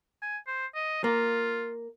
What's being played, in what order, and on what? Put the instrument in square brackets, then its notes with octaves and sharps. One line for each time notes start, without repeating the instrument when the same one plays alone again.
[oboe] G#5
C5
D#5
[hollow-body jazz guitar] A#3 [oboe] F4